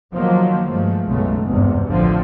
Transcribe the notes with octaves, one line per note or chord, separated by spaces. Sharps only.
D#3 F3 F#3 A#3
G2 F3 G#3 A3
B1 F#2 C#3 G#3 A3
G#1 E2 G2 C3
A1 D2 D3 F3 A3 C4